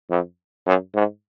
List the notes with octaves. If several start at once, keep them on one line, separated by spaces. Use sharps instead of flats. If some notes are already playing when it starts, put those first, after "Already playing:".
F2
F#2
G#2